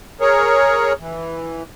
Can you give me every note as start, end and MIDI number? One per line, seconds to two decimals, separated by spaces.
0.21 0.93 68
0.21 0.93 70
0.21 0.93 73
1.00 1.63 52